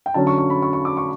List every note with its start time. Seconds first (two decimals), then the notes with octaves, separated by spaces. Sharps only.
0.06 G5
0.14 D3 F#3 C#4 A5
0.27 C#6
0.38 C#6
0.50 B5
0.62 C#6
0.73 C#6
0.85 D6
0.97 C#6